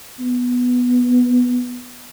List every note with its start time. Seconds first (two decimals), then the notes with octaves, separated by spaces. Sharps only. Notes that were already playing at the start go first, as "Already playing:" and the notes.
0.20 B3